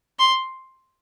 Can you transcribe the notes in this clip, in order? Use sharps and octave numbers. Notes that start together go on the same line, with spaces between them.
C6